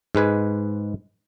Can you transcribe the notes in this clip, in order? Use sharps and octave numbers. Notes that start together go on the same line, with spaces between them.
G#2 G#3 B4 G#5